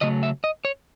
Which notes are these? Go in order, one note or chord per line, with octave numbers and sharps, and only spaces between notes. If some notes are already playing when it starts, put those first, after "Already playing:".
C#3 F#3 A3 D#5
E5
D#5
C#5